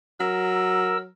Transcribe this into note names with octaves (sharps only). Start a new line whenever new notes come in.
F#3 A#4 E6